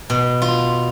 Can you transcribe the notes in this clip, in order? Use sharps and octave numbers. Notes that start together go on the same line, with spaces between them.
B2
F4